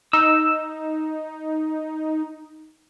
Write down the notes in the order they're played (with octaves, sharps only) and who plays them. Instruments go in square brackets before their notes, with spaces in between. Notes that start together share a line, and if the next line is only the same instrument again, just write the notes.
[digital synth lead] D#4 [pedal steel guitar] E6